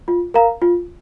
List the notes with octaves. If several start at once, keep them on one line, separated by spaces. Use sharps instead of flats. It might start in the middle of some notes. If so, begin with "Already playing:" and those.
F4
A#4 F5 A#5
F4